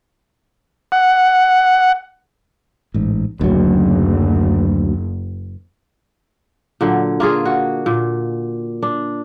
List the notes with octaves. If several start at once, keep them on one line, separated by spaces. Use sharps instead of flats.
F#5
A1 G#2
F#1 D2 F#3
A#2 D3 F#3
A#3 F4 G#4
F#4
A#2
D4